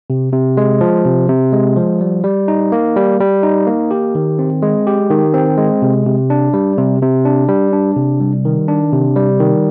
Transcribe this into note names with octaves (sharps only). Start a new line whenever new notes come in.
C3
C3
G#3
F3
C3
C3
G#3
F3
G3
G3
D#4
A#3
G3
G3
D#4
A#3
G4
D#3
C4
G#3
G4
D#3
C4
G#3
C3
C3
D4
G3
C3
C3
D4
G3
D4
C3
G3
D#3
D4
C3
G3
D#3